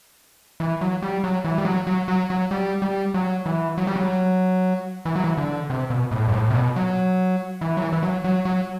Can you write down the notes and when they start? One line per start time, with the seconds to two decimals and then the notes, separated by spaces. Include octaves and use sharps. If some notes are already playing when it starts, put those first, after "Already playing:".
0.60 E3
0.81 F#3
1.02 G3
1.24 F#3
1.45 E3
1.58 G3
1.65 F#3
1.87 F#3
2.08 F#3
2.30 F#3
2.51 G3
2.82 G3
3.14 F#3
3.46 E3
3.78 F#3
3.87 G3
3.96 F#3
5.05 E3
5.16 F#3
5.24 E3
5.37 D3
5.70 C3
5.90 B2
6.11 A2
6.28 G2
6.33 A2
6.50 C3
6.54 B2
6.76 F#3
7.61 E3
7.77 F#3
7.81 E3
7.92 E3
8.03 F#3
8.24 F#3
8.45 F#3